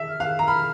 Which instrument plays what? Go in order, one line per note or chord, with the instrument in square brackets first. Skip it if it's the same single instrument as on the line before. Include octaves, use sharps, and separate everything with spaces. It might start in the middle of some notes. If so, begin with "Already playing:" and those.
Already playing: [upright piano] E5
[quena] F6
[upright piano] F5 [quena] F#6
[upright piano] A#5
[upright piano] B5 [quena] F6